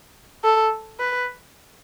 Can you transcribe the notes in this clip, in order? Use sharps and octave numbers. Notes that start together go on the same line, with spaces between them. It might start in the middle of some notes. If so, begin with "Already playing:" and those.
A4
B4